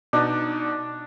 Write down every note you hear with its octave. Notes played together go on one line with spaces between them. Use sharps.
B2 D4 D#4